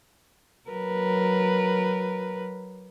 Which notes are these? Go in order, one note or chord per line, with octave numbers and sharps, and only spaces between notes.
F#3 A#4 B4